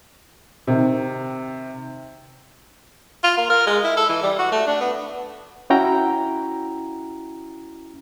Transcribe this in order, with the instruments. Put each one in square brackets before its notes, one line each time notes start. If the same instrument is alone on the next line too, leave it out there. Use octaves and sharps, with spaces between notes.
[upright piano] C3 D#3
[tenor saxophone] F4
A#3
A#4
G#3
E4
A4
E3
G3
F#4
A3
D4
B3
[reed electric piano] C#4 E4 F#4 G5 A#5